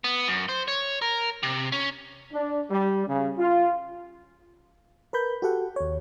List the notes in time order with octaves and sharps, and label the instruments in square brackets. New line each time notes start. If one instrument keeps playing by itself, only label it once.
[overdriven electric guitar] B3
F#2
C5
C#5
A#4
C3
C#4
[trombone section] D4
G3
C#3
F4
[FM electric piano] A#4 B4 B5 G6
F#4 G4 A4 F#5
D#2 C#5